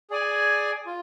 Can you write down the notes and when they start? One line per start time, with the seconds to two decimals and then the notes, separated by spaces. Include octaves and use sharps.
0.10 G#4 D5 G#5
0.86 F4